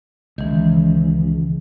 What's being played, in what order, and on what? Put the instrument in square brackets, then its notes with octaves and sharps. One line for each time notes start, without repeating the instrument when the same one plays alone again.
[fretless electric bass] C#2 [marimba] D#3 E3